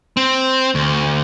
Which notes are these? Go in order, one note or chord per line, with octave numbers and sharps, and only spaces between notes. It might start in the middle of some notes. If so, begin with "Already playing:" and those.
C4
D2